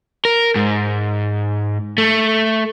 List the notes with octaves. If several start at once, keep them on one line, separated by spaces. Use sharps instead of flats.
A#4
G#2
A3